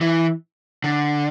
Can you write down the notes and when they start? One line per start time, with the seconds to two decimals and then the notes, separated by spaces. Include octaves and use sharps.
0.01 E3
0.84 D3